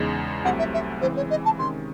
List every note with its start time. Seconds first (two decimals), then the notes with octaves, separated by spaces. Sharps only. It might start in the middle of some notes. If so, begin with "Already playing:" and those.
Already playing: E2 C#3 G#3 D#4
0.44 C2 C3 F#3 A3 F#5
0.59 E5
0.74 E5
1.01 C#3 E3 G#3 C4 C5
1.16 C#5
1.30 D#5
1.45 A5
1.58 C3 D#3 G#3 C#4 C6